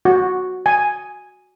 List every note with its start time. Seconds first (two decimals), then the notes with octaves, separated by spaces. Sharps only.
0.05 F#4
0.66 G#5